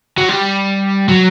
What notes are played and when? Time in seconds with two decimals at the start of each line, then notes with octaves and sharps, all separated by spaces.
0.18 F#3
0.29 G3
1.09 F#3